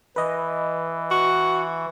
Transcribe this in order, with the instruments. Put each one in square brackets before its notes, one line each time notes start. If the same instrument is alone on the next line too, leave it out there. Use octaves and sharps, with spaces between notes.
[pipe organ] E3 [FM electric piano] B4 D#5
[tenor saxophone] F#4